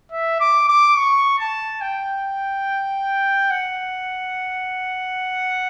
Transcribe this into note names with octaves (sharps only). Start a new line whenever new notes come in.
E5
D6
D6
C#6
A5
G5
F#5